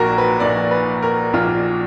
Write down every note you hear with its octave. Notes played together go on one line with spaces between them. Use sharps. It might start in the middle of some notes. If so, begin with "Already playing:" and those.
Already playing: A#1 A#2 F#4 A#4
B4
A#1 A#2 D5
B4
A#4
A#1 A#2 F4